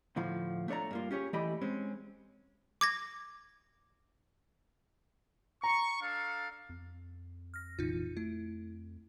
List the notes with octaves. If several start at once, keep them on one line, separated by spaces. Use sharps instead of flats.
D2 A2 F3 F5
A3 D4 C#5 D5 A#5
G2 A#3 F4
C#4 G4 G#4 C#5
E3 A3 G4 D5 D#5 B5
G#3 C4 C#4
D6 G#6 A#6
A#5 C#6
D4 A4 F5
F2
F6 A#6
F1 A#1 E3 D#4 F4
A3 E4